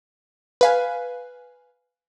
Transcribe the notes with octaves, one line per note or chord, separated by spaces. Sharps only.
B4 F5 G#5